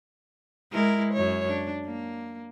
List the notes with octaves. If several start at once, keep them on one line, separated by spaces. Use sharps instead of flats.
G#3 E4 A#4
F#2 C#5
D4
A#3